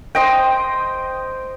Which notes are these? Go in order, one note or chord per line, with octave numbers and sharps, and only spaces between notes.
C5 D#5 G5